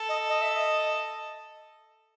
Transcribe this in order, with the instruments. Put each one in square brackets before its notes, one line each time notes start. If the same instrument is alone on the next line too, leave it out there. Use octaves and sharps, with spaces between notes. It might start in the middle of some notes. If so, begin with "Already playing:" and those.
Already playing: [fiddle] A4
[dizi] D#5
D#5
E5
D#5